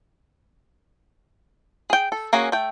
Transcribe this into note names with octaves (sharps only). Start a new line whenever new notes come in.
G#4 G5
A4
A#3 C#4 F#4 G#4
A3 G5